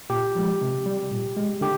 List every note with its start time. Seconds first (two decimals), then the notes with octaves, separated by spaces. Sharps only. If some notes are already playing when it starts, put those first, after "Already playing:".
0.10 A#2 G4
0.35 F3 G#3
0.61 C3
0.86 G3
1.11 A#2
1.36 G#3
1.61 D3 G4